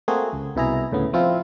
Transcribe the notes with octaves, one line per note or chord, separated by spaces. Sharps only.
A3 A#3 C4 F#4 G#4
C#2
C2 B2 E4 G#4 A#5
D2 A2 C#3 B3
F3 C4 E4 F4